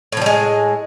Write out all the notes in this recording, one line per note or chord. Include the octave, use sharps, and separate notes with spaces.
A2 F3 G3 G#3